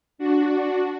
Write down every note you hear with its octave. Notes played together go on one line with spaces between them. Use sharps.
D4 F#4